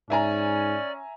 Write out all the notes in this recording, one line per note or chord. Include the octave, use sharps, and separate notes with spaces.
G#2 C#4 D5 E5 G#5 A#5